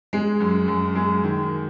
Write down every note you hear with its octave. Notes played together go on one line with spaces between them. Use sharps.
G#3
F#2
F#2
G#3
D#3